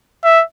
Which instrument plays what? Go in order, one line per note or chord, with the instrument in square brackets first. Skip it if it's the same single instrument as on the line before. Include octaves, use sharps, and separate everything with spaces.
[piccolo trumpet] E5